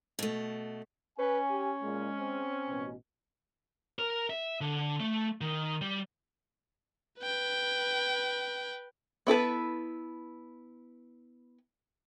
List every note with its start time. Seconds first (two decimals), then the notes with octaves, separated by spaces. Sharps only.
0.19 B2 A3
1.19 C#4 B4 G#5
1.50 G4
1.83 A#2 G#3
2.19 C4
2.68 A1 B2
3.99 A#4
4.30 E5
4.61 D3
5.00 A3
5.41 D#3
5.81 G3
7.19 B4 G5
9.27 B3 E4 A4 B4